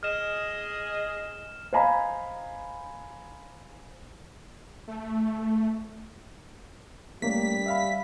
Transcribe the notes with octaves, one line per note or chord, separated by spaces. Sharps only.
G#4 D#5 F6 E7
C5 D#5 F5 G#5 A#5 B5
A3
G3 A3 A#3 C#4 B6
E5 F5 B5